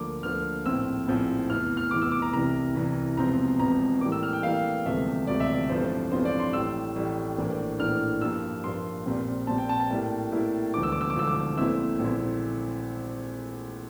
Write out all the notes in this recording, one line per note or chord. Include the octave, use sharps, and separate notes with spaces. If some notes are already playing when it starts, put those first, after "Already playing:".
Already playing: D2 D3 F3 A#3 D6
D2 D3 F3 A#3 F6
A#1 A2 F3 C4 E4 E6
A#1 A2 F3 C4 E4
F1 E2 E3 F6
F6
F1 E2 E3 D6
E6
D6
A#5
C2 C3 E3 A#5
C2 C3 E3
E1 E2 C3 F3 C4 A#5
E1 E2 C3 F3 C4 A#5
A2 E3 G3 A#3 D6
E6
F6
G5
A2 E3 G3 A#3 F5
E1 D2 C3 F3 A3 E5
E1 D2 C3 F3 A3 D5
E5
D5
A1 G2 F3 A3 C4 C5
A1 G2 F3 A3 C4 C5
D5
C6
A1 A2 G3 E6
A1 A2 G3
A#1 A2 E3 A#3 D4
A#1 A2 E3 A#3 D4 F6
G2 F3 A#3 E6
G2 F3 A#3 C6
A#1 A#2 G3 C4
A#1 A#2 G3 C4 A5
G5
A5
A5
A2 G3 A#3 E4
A2 G3 A#3 E4
E1 D2 D3 F3 D6
E6
D6
E6
D6
E1 D2 D3 F3 E6
D6
A#1 A#2 A3 C4 E4 E6
A#1 A#2 A3 C4 E4